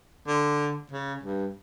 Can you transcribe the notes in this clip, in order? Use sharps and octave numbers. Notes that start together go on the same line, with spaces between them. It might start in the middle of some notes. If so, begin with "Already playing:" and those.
D3
C#3
G2